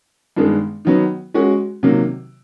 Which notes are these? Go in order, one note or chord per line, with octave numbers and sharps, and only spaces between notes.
G2 D#3 G#3 B3 D4
D#3 F#3 B3
G#3 C#4 F#4
C3 D#3 F#3 A#3